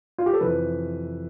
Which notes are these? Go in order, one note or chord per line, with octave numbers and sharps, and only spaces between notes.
F4
G4
A4
F2 C3 E3 B4